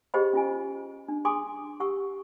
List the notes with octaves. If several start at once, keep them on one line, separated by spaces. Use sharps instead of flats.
G4 G#4 C5 D#5 F#5 B5
C#4 F4 G#5
D4
G#4 G#5 C6 D6 D#6
G4 F#5 C#6 E6